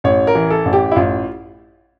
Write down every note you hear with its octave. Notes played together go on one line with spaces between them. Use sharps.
A1 C#5
A#4
E3
A4
A1
G4
E4
A1 F4